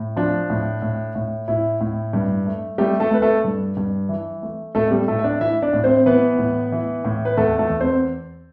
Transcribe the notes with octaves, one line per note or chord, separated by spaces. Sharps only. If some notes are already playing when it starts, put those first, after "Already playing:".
Already playing: A2
F3 D4
A2
A2
A2
A2 E4
A2
G2
A3
G3 A3 G4
A3 A4
A3
B4
A3 A4
G2
G2
E3
A3
A2 A3 A4
G3 G4
A2 A3 A4
E5
D4 D5
E3 E4 E5
D4 D5
A2
C4 C5
E3 B3 B4
A2
E3
A2
B4
E2 A3 A4
A3 A4
E2
C4 C5